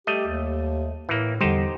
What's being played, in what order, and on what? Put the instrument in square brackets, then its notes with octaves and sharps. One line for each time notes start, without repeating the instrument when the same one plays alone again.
[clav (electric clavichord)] G3 A3 D#5 [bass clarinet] G4
[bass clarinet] D#2
[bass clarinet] A2 [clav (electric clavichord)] E3 A#3
[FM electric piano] E2 G3 [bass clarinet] D3 [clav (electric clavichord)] D#4 G4 C5